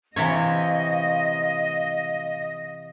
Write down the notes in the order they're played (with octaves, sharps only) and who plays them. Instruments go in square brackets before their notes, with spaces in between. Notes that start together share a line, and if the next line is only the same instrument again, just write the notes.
[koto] C3 E3 C#5 [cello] D#5 [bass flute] F5